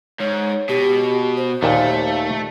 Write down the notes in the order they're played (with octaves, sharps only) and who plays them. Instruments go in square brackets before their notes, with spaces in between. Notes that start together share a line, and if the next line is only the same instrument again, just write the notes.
[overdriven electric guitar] G#2 [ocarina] C#5
[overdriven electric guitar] B2 [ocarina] G4
[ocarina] C5
[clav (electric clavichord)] D#2 A#2 [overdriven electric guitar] A3